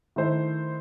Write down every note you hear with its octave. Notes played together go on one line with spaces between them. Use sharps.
D#3 A3 E4 C5